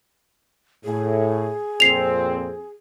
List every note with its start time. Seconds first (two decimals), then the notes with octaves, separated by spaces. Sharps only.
0.84 A2 G#4
1.80 F2 A#2 C4 C7 F7